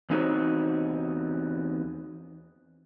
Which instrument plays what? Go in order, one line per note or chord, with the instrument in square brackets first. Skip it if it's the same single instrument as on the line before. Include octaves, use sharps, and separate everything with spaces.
[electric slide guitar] E2 C4 D#4 F#4 C5 C#5